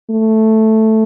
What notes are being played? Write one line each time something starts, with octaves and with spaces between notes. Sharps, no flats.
A3